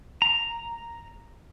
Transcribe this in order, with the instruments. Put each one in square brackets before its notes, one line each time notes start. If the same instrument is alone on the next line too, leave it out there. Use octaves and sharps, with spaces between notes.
[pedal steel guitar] A#5